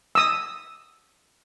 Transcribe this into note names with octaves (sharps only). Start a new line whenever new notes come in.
D#6 E6